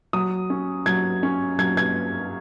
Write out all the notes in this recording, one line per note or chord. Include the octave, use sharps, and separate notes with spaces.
F#3 D#6
C#4
F#3 G#6
C#4
F#3 G#6
G#6